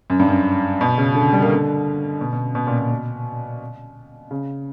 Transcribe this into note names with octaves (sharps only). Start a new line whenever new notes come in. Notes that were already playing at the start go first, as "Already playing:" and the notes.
F#2
G2
F#2
B2
C#3
D3
G3
A#3
D3
B2
B2
B2
A#2
B2
B2
C#3